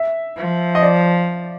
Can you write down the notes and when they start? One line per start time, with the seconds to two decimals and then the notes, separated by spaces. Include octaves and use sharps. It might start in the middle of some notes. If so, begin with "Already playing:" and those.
Already playing: E5
0.37 F3
0.75 D#5
0.82 D5